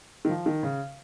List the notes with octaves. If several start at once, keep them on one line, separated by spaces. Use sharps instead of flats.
D#3
F3
D#3
C#3